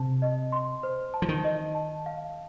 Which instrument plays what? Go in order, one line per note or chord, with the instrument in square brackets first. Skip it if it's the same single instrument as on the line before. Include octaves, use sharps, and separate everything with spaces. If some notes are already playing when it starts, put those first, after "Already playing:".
Already playing: [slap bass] C3 [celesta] A5
[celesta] D#5
C6
C5
A5
[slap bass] F3
D#3
[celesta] D#5
A5
F5